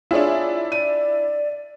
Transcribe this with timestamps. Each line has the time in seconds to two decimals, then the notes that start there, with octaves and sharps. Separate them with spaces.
0.11 D4 E4 F4 G#4 C#5
0.72 D5 D#7